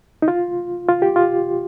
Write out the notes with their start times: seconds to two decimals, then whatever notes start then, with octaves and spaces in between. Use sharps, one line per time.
0.22 D#4
0.28 F4
0.88 F4
1.02 G4
1.16 F4